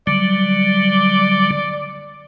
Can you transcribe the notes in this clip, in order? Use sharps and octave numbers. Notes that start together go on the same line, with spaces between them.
D3 F#3 G3 D5